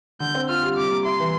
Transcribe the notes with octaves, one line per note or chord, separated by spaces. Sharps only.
D3 G6
C4
F4 F6
G3
C3 D6
A#3
E4 C6
E3